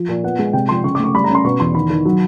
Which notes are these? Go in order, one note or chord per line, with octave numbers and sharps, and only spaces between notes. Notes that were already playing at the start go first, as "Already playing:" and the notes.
Already playing: F3
A#2
B3 F#5
G#3
C3 G5
F3 C6
C#3 C#6
D6
A3 C#6
G3 B5
A#5
C#4
C6
B2 C#6
E2 C6
D#3 B5
D#3
F#3